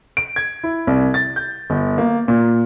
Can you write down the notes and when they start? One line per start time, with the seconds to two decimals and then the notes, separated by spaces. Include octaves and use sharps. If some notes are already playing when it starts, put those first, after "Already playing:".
0.17 D7
0.36 G#6
0.63 E4
0.87 C2
1.14 A6
1.36 G6
1.70 G1
1.98 A#3
2.28 A#2